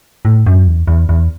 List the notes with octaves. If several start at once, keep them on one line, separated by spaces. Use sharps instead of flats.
A2
F#2
E2
E2
E2